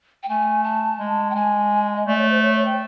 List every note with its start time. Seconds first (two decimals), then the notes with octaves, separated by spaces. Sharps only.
0.23 G5
0.28 A3 G#5
0.64 A5
0.99 G#3
1.30 G5
1.35 G#3 G#5
1.96 D#5
2.07 A3 D5
2.18 C#5
2.30 C5
2.42 C#5
2.55 C#5
2.65 G5